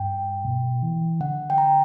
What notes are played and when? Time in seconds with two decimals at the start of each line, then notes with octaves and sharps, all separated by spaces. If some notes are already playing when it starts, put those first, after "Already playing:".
Already playing: G2 G5
0.45 B2
0.83 E3
1.21 D3 F#5
1.50 G5
1.58 A#5